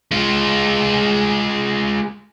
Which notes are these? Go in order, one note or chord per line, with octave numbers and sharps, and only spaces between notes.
G#3 F4